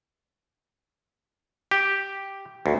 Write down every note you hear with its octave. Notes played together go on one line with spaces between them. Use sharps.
G4
D2